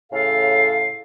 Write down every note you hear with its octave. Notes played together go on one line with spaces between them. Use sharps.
A2 C#3 A4 F5